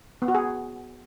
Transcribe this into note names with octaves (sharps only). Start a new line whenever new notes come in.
B3
F#4
G#4